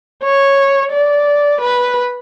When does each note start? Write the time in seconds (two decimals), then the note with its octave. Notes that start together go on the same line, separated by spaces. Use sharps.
0.23 C#5
0.92 D5
1.61 B4